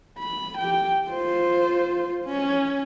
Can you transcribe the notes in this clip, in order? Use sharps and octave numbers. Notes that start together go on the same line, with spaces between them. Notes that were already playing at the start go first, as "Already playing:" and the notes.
B5
G4 G5
F4 C5
C#4